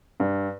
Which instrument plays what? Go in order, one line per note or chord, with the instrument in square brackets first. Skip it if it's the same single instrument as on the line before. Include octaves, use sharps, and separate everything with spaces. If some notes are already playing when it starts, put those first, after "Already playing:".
[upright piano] G2